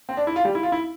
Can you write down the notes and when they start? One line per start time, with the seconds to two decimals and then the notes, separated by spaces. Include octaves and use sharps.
0.09 C4
0.17 D4
0.27 E4
0.36 F4
0.45 G3
0.55 E4
0.63 F4
0.72 E4